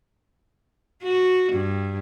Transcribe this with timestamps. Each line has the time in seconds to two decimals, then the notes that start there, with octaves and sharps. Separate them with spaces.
1.03 F#4
1.53 G2